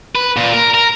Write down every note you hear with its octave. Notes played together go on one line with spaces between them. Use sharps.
B4
A#2
A#4
A#4